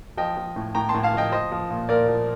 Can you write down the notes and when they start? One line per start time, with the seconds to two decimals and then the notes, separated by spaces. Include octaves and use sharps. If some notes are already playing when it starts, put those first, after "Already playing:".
0.17 F3 D#5 G5
0.37 F3
0.56 A2
0.75 A2 G5 A#5
0.89 A5 C6
0.94 A2
1.03 F5 A5
1.13 F3 D#5 G5
1.32 F3 C5 D#5
1.52 F3
1.70 A#2
1.89 A#2 A#4 D5
2.08 F3